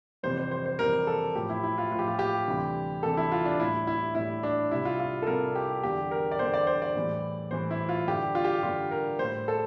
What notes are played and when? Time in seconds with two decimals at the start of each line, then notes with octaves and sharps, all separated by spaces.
0.23 F2 C3 E3 G3 C5
0.37 C5
0.51 C5
0.66 C5
0.79 F2 C3 E3 G3 A#4
1.07 A4
1.35 A2 F3 G4
1.49 E4
1.63 E4
1.78 F4
1.92 A2 F3 F4
1.99 G4
2.08 F4
2.19 G4
2.48 D2 C3 E3 G3
3.03 D2 C3 E3 G3 A4
3.17 E4
3.32 F4
3.45 D4
3.59 A2 G3 E4
3.87 E4
4.15 A2 G3 E4
4.43 D4
4.71 C2 C3 G3 E4
4.85 F4
5.00 F4
5.22 A4
5.27 C2 C3 G3 A#4
5.55 G4
5.83 E2 D3 G3 G4
6.11 A#4
6.31 D5
6.39 E2 D3 G3 C5
6.54 D5
6.67 C5
6.82 D5
6.95 A2 E3 G3
7.51 A2 E3 G3 C5
7.71 E4
7.89 F4
8.07 G2 D3 G3 G4
8.35 F4
8.45 G4
8.63 G2 D3 G3 F4
8.91 A#4
9.19 A2 G3 C5
9.48 A4